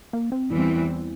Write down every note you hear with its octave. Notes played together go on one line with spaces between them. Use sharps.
A#3
C4
E2 E3 G3 C4 E4